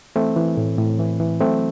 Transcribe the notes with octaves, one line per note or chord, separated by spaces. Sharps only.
E3 A3 C4
E3
A2
A2
E3
E3
F#3 A3 C4